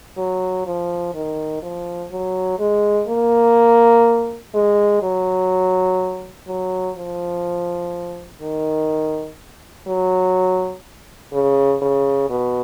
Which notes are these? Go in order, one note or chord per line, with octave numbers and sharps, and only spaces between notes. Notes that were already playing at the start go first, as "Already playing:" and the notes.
F#3
F3
D#3
F3
F#3
G#3
A#3
G#3
F#3
F#3
F3
D#3
F#3
C#3
C#3
B2